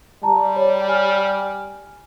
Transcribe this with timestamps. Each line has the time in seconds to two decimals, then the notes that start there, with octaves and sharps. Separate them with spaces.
0.23 G3 A5 A#5
0.56 C#5
0.88 G#5 F6